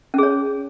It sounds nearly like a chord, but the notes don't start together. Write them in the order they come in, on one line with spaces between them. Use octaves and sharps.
C#4 G#4 C#5